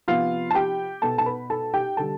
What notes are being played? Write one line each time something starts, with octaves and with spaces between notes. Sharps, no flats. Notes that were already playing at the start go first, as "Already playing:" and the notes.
C3 F3 B3 F4 F5
A5
G4 G5
B2 B3 A4 A5
A5
B4 B5
A4 A5
G4 G5
D3 G3 A4 A5